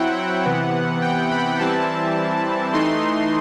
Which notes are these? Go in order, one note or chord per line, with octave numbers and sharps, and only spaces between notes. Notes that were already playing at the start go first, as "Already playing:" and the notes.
Already playing: F#3 C4 E4 F#5 G5
C3 E3 B3
G5
B5
E3 G3 C4 E4 A5
E3 A3 D#4 C6